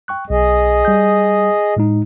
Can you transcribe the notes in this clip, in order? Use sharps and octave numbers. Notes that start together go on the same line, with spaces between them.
G5 C#6 F#6
B1 G#4 D#5
G3 G6
A2 G#3 D#4